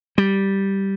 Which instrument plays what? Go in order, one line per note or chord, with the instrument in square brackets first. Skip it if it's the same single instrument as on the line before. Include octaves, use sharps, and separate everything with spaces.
[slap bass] G3